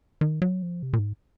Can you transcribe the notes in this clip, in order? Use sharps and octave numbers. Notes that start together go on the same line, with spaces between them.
D#3
F#3
F3
C3
A#2
G#2